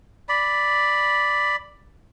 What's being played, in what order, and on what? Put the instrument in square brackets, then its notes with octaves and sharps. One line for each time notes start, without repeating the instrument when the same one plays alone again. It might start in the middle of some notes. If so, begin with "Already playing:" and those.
[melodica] D5 B5